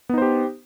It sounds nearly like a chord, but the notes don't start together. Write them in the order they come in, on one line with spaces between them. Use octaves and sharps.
B3 D#4 C5 G4